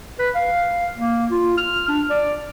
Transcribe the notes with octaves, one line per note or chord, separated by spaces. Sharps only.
B4
F5
A#3
F4
F6
D4
D5